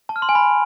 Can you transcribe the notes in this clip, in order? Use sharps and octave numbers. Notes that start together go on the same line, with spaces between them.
A5
F6
C6
G#5
B5